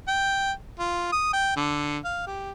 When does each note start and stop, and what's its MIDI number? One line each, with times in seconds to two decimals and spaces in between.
0.08 0.52 79
0.79 1.09 65
1.12 1.31 87
1.33 1.52 79
1.56 1.98 50
2.04 2.23 77
2.27 2.52 67